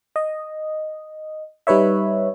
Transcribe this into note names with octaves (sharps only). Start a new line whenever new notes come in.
D#5
G3 D#4 B4 C#5 E5